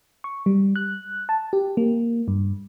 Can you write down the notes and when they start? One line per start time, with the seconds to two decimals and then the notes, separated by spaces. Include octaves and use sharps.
0.24 C#6
0.46 G3
0.76 F#6
1.29 A5
1.53 G4
1.77 A#3
2.28 G2